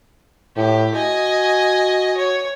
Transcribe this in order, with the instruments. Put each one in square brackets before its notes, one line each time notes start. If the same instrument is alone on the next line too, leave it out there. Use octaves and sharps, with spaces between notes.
[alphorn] A2 [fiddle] G4
[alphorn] F#4 [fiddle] D#5 G#5
[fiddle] C#5